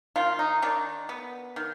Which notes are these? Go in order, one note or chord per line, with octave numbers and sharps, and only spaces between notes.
D#3 F4
D#4
D#3 D4
B3
D#3